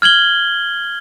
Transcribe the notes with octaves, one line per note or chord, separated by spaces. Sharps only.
F6 G#6 F#7 G7